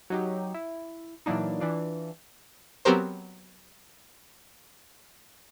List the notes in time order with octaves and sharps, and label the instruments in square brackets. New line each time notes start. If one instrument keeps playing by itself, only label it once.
[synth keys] F#3 D#4 G4
E4
A#2 E3 F#3 A#3 D4 D#4
E3 D4 F4
[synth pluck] F#3 B3 C4 G4 A#4 C5